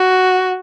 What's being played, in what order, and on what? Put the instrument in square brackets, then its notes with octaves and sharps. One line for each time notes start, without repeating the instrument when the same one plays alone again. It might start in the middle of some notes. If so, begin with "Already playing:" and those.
Already playing: [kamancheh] F#4